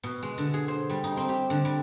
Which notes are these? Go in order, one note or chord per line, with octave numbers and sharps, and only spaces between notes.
B2
G#3
D3
G#4
C5
G3
D#4
C4
G4
D3
G3